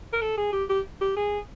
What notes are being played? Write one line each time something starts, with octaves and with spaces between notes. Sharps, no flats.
A#4
A4
G#4
G4
G4
G4
G#4